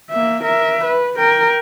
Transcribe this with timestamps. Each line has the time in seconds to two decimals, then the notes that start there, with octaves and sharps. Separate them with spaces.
0.11 A#3 E5
0.44 A#4 E5
0.85 B4
1.18 A#4 G5